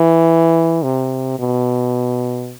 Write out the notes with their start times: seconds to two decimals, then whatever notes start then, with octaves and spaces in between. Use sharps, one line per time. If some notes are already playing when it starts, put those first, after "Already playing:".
Already playing: E3
0.84 C3
1.39 B2